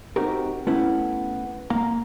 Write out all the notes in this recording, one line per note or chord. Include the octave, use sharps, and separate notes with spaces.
C4 D#4 F#4 G4 A#4
A3 B3 C#4 E4
A#3 F5 A#5